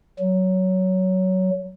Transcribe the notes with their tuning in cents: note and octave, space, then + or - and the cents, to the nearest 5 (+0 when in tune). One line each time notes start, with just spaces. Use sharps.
F#3 +15